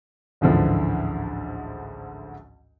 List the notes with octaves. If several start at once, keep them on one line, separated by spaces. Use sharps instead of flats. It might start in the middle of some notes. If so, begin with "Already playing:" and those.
A1 D2 G#2 D3 E3 F3